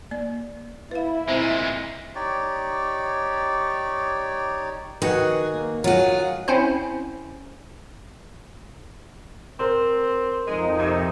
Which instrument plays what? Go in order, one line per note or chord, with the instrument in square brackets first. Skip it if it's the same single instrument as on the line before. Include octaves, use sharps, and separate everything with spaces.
[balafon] A#3 D5
[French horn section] E4 [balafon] B4 F5
[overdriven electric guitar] A#2 G#3 [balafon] C4 C5
[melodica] D#4 G4 C#5 D5
[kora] D#3 F#4 F#5 [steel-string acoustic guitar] G#4 [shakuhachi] B4
[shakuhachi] A#3
[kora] F#3 [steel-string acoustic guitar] F4 G#4 [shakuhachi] F#5
[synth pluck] C4 C#4 E4 C5
[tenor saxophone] C4 [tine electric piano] A#4 C5 C6
[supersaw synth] F2 D#4 [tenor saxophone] G#3
[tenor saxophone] C3